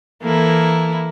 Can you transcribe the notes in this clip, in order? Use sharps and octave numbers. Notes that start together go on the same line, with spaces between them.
E3 A#3 E4 A4